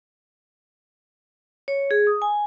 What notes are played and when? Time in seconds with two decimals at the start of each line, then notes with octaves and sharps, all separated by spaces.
1.68 C#5
1.91 G#4
2.07 D#6
2.22 G#5